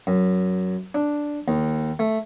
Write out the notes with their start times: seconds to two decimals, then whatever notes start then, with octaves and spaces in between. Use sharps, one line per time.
0.07 F#2
0.95 D4
1.48 D#2
1.99 A3